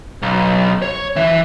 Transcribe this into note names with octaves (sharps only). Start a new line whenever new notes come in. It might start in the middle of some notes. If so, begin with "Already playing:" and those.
B1
C#5
E3 E5